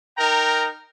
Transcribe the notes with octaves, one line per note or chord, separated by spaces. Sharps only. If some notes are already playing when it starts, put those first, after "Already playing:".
D#4 A#4 G5 A#5